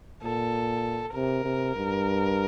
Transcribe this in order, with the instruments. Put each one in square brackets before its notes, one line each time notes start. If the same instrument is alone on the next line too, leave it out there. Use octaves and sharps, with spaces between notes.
[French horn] A#2 [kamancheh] A4
[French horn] C3 [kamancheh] A#4
[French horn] C3
G2